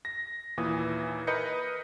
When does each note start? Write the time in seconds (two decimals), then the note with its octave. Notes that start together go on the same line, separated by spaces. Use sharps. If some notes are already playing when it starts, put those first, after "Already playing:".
0.05 A#6
0.57 D#2 A#2 E3 D#6
1.27 A#4 B4 D#5 G6 C#7